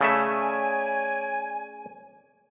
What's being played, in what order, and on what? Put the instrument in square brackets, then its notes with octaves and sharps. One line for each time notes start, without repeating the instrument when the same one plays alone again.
[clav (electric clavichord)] C#3 A3 E5 [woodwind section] C#5 D5 G#5